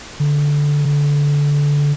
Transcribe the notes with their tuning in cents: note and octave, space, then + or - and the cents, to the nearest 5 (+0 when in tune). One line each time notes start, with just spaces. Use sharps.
D3 -10
D3 -20